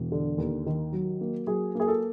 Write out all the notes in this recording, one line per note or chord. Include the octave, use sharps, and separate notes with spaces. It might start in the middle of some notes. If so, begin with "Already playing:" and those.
Already playing: E1
D3
D#2
D#3
F#3
A#3
F#3 G#4
A#3 G#4
A4